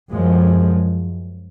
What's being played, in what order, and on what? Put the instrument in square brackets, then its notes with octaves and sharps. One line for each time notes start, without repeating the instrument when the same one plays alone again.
[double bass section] F#2 F3 G#3